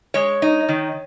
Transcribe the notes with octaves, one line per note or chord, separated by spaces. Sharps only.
G#3 C#5
D#4
D#3